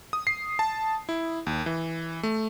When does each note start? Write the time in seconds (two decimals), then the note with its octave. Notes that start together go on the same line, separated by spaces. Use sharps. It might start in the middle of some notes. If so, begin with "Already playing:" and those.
0.13 D#6
0.27 C7
0.59 A5
1.09 E4
1.47 D#2
1.66 E3
2.23 A3